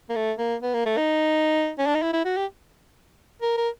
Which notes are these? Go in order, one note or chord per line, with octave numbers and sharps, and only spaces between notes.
A#3
A3
A#3
B3
A#3
A3
D#4
C#4
D4
D#4
E4
E4
F#4
G4
A#4
A#4